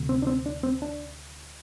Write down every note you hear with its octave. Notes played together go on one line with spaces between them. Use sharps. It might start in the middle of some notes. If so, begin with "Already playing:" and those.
Already playing: D2 C3
C4
D4
C4
D4
C4
D4